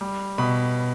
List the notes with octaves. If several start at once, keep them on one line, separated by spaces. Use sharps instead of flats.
G3
B2 B5